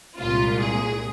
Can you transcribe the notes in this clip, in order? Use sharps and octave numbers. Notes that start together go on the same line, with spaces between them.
C2 A#2 G#3 F4
G#4